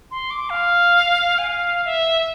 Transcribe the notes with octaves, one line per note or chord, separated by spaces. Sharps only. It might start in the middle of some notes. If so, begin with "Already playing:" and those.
C6
D6
F5
G#5
F5
E5